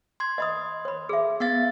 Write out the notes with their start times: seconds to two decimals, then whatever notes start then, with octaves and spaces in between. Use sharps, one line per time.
0.20 C6 G#6
0.38 D#5 B5 D#6
0.85 C#5 B5
1.09 G#4 E5
1.40 B3 F5 A6